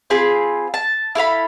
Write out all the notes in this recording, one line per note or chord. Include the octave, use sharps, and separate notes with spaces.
C4 F4 G#4 B5
A5
E4 A4 F5 B5